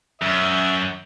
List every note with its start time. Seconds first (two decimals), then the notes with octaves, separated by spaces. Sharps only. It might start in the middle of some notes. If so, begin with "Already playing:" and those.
0.22 F#2 E5 D#6